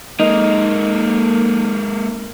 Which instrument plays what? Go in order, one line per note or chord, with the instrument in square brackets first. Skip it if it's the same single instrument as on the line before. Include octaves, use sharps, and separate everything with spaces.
[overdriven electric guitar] G#3 A#3 [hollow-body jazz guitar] D#4